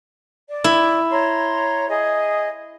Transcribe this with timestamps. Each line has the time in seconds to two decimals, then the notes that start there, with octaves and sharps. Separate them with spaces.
0.49 D5
0.64 E4
1.10 C#5 A#5 C6
1.88 G#4 D#5